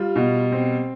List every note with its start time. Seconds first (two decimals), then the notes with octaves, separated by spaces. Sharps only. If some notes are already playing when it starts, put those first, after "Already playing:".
Already playing: G3 F4
0.16 B2
0.52 C4